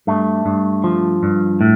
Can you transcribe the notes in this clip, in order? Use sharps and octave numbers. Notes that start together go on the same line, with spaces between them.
G2 A3
G2
F3
G2
A2